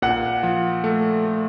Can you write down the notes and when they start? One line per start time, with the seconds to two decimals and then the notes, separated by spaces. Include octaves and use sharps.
0.02 A#2 F#5
0.43 F3
0.84 A3
1.25 A3